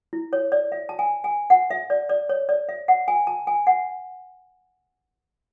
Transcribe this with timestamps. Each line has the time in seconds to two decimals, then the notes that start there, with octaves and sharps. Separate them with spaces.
0.13 E4
0.33 C#5
0.52 D5
0.72 E5
0.89 A5
0.99 G#5
1.24 G#5
1.50 F#5
1.71 E5
1.90 D5
2.09 D5
2.29 C#5
2.49 D5
2.69 E5
2.88 F#5
3.08 G#5
3.27 A5
3.47 G#5
3.67 F#5